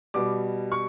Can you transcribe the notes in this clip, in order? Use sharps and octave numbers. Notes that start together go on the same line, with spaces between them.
B2 G3 D6
C#6